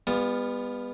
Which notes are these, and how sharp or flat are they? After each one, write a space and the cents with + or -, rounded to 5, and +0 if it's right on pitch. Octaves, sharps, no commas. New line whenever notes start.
G3 +45 B3 +0 F4 +0